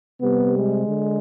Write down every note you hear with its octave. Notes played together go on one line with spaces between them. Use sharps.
C3 G3 B3
G#3
D3